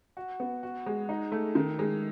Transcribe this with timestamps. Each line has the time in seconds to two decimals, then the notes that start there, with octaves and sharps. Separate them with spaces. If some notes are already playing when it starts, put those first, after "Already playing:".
0.17 F#4
0.40 B3
0.63 F#4
0.86 G#3
1.09 D#4
1.32 A3
1.55 D#3
1.79 G#3